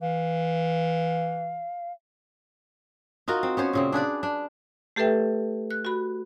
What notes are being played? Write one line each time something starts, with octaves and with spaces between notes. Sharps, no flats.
E3 F5
D#4 F4 F#4 A#4
C4
B3 C#4 C5 C#5
A#2 C#3 C4
D4 G#4 B4 D5
D4
A3 G4 A4 B4 E5 G5
F#6
F#4 B5